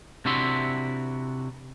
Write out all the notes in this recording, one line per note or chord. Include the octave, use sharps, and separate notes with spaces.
C3 D4 E4 F#4 E5 C6